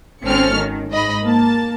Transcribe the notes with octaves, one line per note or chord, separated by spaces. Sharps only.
G#1 C4 C#4 A4 F6 C#7
D#3
G#2 D#5 B5
A#3 A5